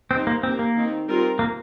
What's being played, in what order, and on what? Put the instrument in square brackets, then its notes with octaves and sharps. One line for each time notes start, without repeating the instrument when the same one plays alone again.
[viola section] G3 D#4 C5 [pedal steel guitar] C4
[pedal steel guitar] A#3
[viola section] A#3 G4 A#4 [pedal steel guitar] C4
[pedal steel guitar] A#3
[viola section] D#3 C4 D#4
G3 C4 F4 A#4
[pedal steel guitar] A#3